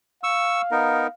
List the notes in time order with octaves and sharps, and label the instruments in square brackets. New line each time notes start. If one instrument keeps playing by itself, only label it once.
[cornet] F5 [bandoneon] C#6 E6
[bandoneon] B3 D#4 A#4